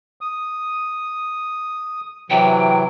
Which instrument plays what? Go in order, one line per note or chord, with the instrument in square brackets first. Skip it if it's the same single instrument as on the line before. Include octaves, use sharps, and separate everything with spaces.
[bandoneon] D#6
[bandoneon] C3 E3 F#3 [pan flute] G5